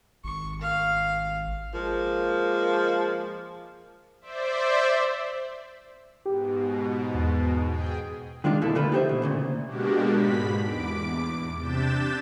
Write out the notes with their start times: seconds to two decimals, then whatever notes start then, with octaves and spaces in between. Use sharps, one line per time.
0.24 G#1 C#6
0.61 F5
1.73 F3 G#3 A#3
4.21 C5 D5 E5
6.26 G#2 B2 G4
7.14 E2 A6
7.64 G#4 G5
8.44 D#3 G#3 D4 F4
8.62 B2 A#3 E4 A4
8.75 D3 F3 A3 F4 A4 B4
8.92 D#4 G4 A4 C5 E5
9.09 B2
9.22 D2 A#2 C#3
9.65 B2 G#3 A#3 D4 F#4 G4
10.14 G#2 B5 B6
10.62 E2 D6 D7
11.58 C3 D4 G6 A6 B6 E7